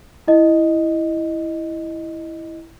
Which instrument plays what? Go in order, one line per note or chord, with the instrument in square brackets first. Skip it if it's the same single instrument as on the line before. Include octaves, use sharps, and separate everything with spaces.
[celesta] E4 D#5